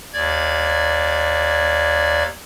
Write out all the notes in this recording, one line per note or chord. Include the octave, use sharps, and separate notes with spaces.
D#2 D5 G#6